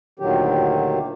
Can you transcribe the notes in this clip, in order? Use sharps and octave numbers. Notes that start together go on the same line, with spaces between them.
D2 A#2 D3 D#3 F#3 G4